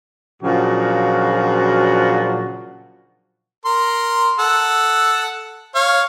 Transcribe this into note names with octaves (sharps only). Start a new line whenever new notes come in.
A#2 C#3 F3 F#3 D4 F#4
A#4 C6
A4 F#5 E6
C#5 F5